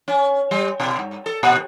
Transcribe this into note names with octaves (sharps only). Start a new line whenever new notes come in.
C#4
G3
B2
G2
A4
A#2